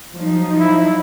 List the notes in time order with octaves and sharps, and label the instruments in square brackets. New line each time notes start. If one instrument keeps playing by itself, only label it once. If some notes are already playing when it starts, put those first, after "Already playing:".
[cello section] F3 F#3 D#4
[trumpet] E4